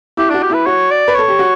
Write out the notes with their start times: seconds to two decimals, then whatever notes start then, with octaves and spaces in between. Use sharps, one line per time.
0.17 E4 G4
0.30 D4 F#4
0.43 G4
0.50 E4 B4
0.66 F#4 C#5
0.91 D5
1.08 B4
1.15 A4 C#5
1.28 G4
1.39 F#4